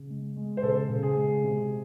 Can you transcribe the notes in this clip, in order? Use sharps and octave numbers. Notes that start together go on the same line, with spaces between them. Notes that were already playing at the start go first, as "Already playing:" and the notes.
Already playing: C#3
G#3
G#3
C5
C#3 A4
C#3
G#4
G#3
C3